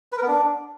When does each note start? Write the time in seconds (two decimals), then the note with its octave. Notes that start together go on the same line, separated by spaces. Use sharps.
0.12 B4
0.17 A#4
0.23 B3
0.28 D4